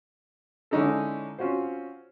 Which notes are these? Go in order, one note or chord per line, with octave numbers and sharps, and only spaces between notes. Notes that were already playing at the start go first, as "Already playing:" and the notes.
D3 G#3 C#4 D#4 E4 A4
C4 C#4 F4 F#4 C5